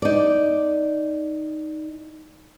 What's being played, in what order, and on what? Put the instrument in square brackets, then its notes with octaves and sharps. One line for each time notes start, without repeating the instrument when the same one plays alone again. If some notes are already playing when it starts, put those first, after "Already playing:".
[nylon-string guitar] D#4 D5